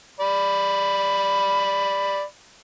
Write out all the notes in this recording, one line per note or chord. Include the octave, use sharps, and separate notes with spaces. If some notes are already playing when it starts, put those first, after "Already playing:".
D5 B5